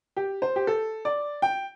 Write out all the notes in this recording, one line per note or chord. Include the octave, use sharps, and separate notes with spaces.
G4
C5
G4
A4
D5
G5